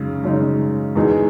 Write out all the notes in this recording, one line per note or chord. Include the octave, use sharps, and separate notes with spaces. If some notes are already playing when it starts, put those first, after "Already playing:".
Already playing: F#2 C#3 G#3 D#4
F#2 C#3 G#3 D#4
E2 B2 G#3 D#4 G#4